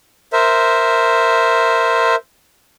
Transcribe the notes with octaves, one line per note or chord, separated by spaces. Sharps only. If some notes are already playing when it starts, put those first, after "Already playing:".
A#4 C5 E5